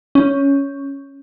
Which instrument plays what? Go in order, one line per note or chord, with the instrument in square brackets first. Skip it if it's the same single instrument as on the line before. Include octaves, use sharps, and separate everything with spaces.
[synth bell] C#4